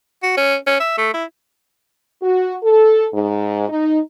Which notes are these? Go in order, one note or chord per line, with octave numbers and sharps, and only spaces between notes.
F#4
C#4
C#4
E5
A3
E4
F#4
A4
G#2
D#4